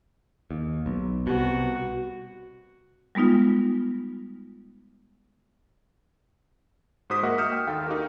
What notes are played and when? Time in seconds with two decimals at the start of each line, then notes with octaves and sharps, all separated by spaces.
0.51 D#2
0.86 B1
1.27 C2 B2 F#4
3.15 G3 G#3 B3 D#4 F4
7.10 G#2 F#4 C5 D#6 B6
7.23 A#3 F#4 A#4 D#5 E5 F#5
7.38 D#6 F6 G6 C#7 E7
7.52 G5
7.67 D#2 D#4 A4 F5 G5
7.86 D#4 F#4 G4 A#4